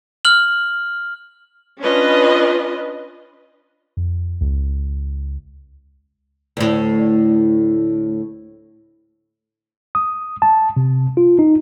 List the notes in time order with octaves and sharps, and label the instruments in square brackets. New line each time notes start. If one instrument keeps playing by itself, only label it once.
[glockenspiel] F6 F#7
[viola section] C#4 D4 F4 B4 D#5
[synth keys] F2
C#2
[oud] D2 A2
[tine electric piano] D#6
A5
C3
F4
D#4